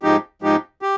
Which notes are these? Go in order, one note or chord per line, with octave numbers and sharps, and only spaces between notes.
G#2 F3 G#3 D#4 G4
G#2 F3 G#3 D#4 G4
G4